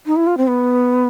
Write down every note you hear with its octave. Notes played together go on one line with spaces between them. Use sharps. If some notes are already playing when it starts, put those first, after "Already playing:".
D#4
E4
F4
C4
B3